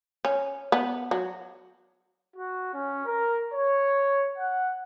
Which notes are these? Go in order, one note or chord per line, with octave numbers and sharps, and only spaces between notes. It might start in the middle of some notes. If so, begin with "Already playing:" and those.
C#4
B3
F#3
F#4
C#4
A#4
C#5
F#5